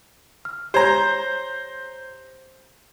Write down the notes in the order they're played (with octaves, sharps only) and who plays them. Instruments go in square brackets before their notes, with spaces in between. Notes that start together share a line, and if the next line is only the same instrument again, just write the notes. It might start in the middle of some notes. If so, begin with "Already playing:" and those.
[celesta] F6
[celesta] G4 C#5 G#6 [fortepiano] C5 A#5